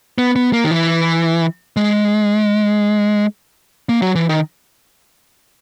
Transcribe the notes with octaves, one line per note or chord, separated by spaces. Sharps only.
B3
B3
A#3
D#3
E3
G#3
A#3
F#3
E3
D#3